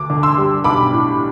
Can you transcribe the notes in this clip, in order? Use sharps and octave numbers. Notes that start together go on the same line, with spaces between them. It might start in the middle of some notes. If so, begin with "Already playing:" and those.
Already playing: D2 D6
D3
C6 E6
G3
B1 B5 D6
A2